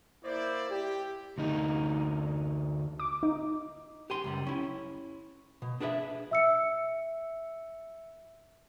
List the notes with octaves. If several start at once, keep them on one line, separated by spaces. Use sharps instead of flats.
A#3 E4 C5 D5
G4
D2 D#4
D6
D#4
G4 G#5 C6
C#2 F#2 G3
C#4 E4
B2
D4 G#4 B4 C#5 E5
E5 E6 C#7